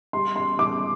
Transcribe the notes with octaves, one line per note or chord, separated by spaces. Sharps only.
G3 C6
C6
G3 D6